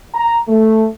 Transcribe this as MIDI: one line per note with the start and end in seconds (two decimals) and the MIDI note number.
0.14 0.38 82
0.49 0.87 57